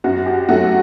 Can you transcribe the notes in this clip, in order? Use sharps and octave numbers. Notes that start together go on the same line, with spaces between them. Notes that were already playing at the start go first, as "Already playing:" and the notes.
F#2 F#4
G4
F#3 A3 F#4